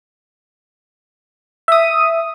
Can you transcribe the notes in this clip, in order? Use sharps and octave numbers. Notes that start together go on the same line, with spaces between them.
E5 D#6